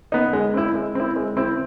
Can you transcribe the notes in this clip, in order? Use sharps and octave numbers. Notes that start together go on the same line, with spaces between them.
B3 D#4
G#3
C4 E4
G#3
C4 E4
G#3
C4 E4